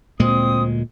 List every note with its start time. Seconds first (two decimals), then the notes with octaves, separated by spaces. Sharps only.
0.20 D2 A#2 G#3 C4 D#6